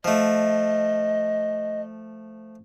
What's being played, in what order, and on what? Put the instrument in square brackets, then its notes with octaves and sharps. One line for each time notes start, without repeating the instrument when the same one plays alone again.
[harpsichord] F3 A3 [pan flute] D#5